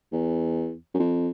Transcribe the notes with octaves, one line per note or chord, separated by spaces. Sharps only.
E2
F#2
F2